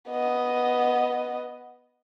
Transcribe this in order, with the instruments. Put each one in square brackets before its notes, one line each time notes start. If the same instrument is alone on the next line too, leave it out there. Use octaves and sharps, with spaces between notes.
[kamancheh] B3 D#5